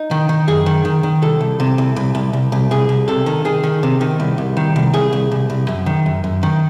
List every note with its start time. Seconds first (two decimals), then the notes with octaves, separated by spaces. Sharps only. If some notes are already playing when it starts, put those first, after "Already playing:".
Already playing: D#4
0.11 D#3
0.29 D#3
0.47 F#2 G#4
0.66 D#3
0.85 D#3
1.03 D#3
1.22 C2 A4
1.41 C2
1.60 C3
1.78 C2
1.96 C2
2.15 C2
2.33 C2
2.52 C2
2.71 C2 G#4
2.89 C2
3.08 C3 A4
3.26 D#3
3.45 D#3 G#4
3.64 D#3
3.83 C3
4.01 D#3
4.20 C2
4.38 C2
4.57 D#3
4.76 C2
4.93 C2 G#4
5.13 C2
5.31 C2
5.50 C2
5.68 F#2
5.86 D#3
6.06 F#2
6.24 F#2
6.43 D#3